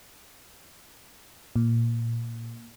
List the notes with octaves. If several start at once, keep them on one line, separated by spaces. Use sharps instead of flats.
A#2